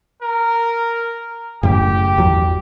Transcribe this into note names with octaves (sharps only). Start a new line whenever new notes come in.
A#4
F#1 F#2 A2 G4
G1 E2 F#3